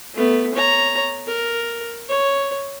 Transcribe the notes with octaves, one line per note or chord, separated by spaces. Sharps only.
A3 B3
C#5 A#5
A#4
C#5